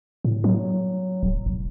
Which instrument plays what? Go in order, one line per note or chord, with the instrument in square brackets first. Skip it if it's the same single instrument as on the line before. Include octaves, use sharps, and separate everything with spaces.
[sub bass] A2
F#3
D1
E1